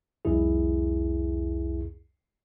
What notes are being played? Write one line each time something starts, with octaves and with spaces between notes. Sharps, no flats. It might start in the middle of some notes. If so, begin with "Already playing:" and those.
C2 F2 E4 G#4